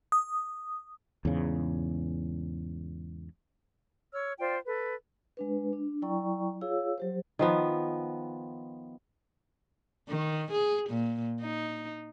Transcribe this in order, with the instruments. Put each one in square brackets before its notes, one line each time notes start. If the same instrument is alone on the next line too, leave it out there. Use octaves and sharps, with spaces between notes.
[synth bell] D#6
[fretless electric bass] E2 G#2 C#3
[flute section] C#5 E6 F6
F4 C5 D5 G5
A4 B4
[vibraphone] G#3 D4 B4
D4
F#3 E4 D5 G5 A#5 C#6
F4 G#4 C#5 F5 E6
F#3 G4 C5
[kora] D#3 F3 B3
[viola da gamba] D#3
G#4
A#2
D#4